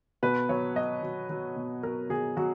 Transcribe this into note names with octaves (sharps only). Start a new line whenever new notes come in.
B2 B4
F#3 C#5
F#3 D#5
F#3
F#3
B2
F#3 A#4
B2 G#4
F#3 F#4